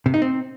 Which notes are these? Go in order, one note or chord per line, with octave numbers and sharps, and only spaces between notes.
C3
D#4
C4